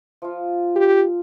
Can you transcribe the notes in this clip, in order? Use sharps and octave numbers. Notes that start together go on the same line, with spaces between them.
F3 F4
G4